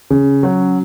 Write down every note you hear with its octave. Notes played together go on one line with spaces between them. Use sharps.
C#3
F#3 C#4 F#4